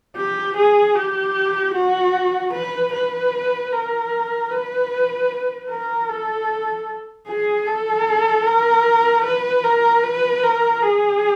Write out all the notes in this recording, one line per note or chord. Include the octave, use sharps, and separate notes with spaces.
G4
G#4
G4
F#4
B4
B4
A#4
B4
A#4
A4
G#4
A4
A#4
B4
A#4
B4
A#4
G#4